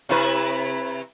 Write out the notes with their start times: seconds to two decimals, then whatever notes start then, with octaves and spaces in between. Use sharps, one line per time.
0.09 C3 E4 B4